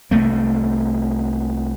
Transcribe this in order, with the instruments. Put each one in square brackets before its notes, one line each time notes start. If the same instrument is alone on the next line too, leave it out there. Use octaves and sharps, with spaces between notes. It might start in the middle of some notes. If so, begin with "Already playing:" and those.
[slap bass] C2 A3 A#3